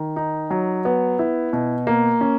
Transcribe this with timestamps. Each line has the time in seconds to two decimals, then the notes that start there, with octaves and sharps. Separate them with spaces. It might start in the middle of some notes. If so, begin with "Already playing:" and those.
Already playing: D#3
0.16 D#4
0.50 F#3
0.85 B3
1.19 E4
1.53 B2
1.87 A#3
2.21 C#4